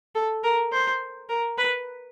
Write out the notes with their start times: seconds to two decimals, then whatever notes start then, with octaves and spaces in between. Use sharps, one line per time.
0.15 A4
0.44 A#4
0.72 C5
1.29 A#4
1.58 B4